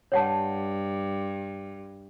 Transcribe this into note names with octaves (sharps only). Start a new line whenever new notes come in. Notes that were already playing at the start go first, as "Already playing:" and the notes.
G2 C#5 F#5 A5